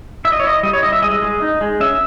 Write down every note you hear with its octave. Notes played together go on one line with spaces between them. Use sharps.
E4 E5
D#5
C#5
E4 D#5
G3 D#5
C#5
E4 D#5
E5
G#3 D#5
G#3
D#4
G#3
C#4 E5